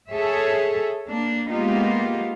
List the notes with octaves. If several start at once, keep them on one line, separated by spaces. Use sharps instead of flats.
G#4 A4 C#5 E5
A#3 D4
G#3 A#3 B3 D#4 F4 G4